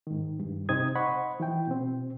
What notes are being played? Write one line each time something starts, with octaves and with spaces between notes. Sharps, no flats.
G#2 D#3
G2
C3 C4 D#4 D#6 G#6
C5 D#5 F#5 B5 C#6
E3 E4 G5
B2 C4